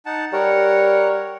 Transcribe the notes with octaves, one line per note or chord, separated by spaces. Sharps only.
D#4 F#5 A5
G3 A#4 C#5 F#5